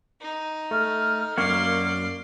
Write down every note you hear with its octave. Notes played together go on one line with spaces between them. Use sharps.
D#4
A3 F6
F#2 A#3 F#4 D5 C6